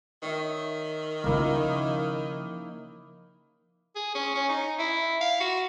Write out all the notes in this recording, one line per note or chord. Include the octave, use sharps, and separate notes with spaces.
D#3 C#5 E5
C#3 F3 A#3 D#4 E4
G#4
C#4
C#4
D#4
E4
F5
F#4